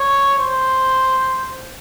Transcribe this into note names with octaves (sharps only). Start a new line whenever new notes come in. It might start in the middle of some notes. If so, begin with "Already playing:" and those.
Already playing: C#5
C5